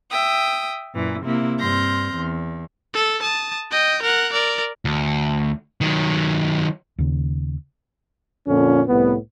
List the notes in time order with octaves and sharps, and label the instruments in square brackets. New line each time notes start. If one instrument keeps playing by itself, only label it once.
[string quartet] E5 G5 D#6
F#2 A#2 E3
C3 A#3 E4
G2 C4 C6 F6 G6 A#6
E2
[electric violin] A4
A5 D#6
D#5 G5
A#4 F#5
A#4 D5
[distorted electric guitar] D2
D#3 F#3
[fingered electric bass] D#2 C#3
[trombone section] F2 A#2 D3 C#4
C2 A2 B3